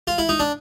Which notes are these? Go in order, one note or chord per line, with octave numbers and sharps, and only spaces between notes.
F4
E4
D#4
D4